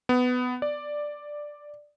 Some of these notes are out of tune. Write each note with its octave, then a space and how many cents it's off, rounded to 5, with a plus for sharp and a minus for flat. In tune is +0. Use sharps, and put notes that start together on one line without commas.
B3 +15
D5 +5